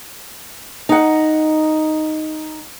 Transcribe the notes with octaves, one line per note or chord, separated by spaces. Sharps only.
D#4 F#5